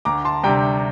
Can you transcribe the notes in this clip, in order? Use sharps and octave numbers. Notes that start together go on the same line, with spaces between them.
D2 A#5 D6
A5 C6
C3 G3 D4 G5 A#5